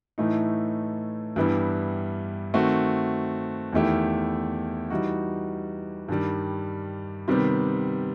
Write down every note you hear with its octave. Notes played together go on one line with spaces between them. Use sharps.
A2 E3 A3 D#4
G2 E3 G3 B3 E4
D#3 A3 C4 F#4
E2 D#3 A3 E4 G4
E3 G3 D#4 F#4
G2 D#3 G3
C3 D#3 G3 B3